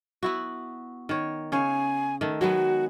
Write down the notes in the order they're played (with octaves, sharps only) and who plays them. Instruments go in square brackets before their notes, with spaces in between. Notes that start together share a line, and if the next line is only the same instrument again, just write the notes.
[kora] B3 E4 F#4
D#3 C#5
[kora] C#3 C#5 [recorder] G#5
[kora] D#3 A3
[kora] F#3 G#3 B3 [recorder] F#4